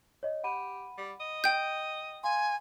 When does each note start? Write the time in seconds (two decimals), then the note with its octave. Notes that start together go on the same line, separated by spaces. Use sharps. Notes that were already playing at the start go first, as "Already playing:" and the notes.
0.23 C#5 D#5
0.44 G4 F#5 B5 D#7
0.97 G3
1.20 D#5
1.44 G5 G6
2.24 F5 G#5 C6